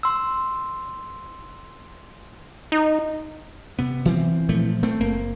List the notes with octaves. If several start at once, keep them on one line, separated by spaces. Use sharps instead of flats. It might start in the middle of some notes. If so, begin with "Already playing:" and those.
C6 E6
D#4
C3 B3
E3 C4
A#2 F3 A3
A3 C4
F#1 A#3